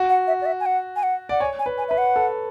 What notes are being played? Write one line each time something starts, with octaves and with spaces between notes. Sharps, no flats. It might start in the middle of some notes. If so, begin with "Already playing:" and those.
Already playing: F#4
F#5
E5
D5
E5
G#5
F#5
G#5
F#5
D5 F#5
C#5 G#5
G#5
B4
G#5
B4 E5
F#5
A4